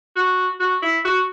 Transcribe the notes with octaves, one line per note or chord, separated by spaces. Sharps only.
F#4
F#4
E4
F#4